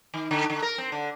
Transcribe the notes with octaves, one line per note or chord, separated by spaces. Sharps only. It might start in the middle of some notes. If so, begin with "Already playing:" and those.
D#3
D3
D3
A#4
C4
D3